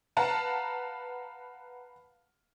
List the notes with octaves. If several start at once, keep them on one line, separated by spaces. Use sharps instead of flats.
B4 F5 F#5 A5 A#5